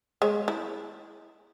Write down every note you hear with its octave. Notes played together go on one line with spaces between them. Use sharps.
G#3 C#5
E4